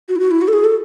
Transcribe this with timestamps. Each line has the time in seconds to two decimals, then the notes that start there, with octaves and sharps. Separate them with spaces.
0.09 F#4
0.16 E4
0.20 F#4
0.31 E4
0.41 F#4
0.48 A4
0.53 G#4
0.64 A4